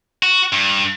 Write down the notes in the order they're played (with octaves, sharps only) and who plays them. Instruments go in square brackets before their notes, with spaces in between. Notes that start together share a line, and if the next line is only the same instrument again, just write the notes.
[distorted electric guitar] F#4
G2